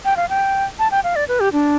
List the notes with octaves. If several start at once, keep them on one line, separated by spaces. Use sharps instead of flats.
G5
F5
G5
A5
G5
F5
D5
B4
G4
D4